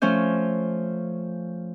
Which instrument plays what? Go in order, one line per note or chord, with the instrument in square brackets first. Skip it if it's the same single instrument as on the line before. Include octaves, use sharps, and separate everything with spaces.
[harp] F3 A3 C#4 C5